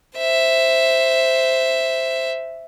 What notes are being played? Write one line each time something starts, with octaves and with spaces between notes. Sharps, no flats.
C5 E5